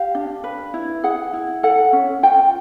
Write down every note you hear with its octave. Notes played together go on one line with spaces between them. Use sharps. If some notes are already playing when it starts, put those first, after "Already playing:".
Already playing: G4 F5
D4
B4
E4
G#4 F#5
E4
A4 F#5
C#4
F4 G5